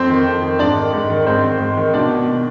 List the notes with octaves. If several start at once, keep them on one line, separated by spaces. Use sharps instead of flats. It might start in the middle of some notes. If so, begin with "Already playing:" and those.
Already playing: F2 C4 C5
D#3
F2
D#3
G#2 D4 D5
D#3
G#2
D#3
G#2 C4 C5
D#3
G#2
D#3
B2 D4 D5
B2
B2